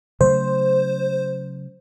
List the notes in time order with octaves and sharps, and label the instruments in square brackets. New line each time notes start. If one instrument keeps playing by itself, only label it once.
[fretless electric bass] C#3 F#3 A3 [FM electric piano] C5